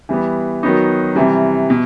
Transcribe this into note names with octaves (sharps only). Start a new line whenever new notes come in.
E3 G3 B3
D#3 F#3 B3 D#4
C3 E3 G3
B2